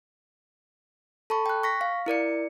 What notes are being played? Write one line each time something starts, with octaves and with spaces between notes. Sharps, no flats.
A4 A5 B5 C#6
G5 F#6
C#6 A#6 B6
F5
E4 A#4 D5 C#7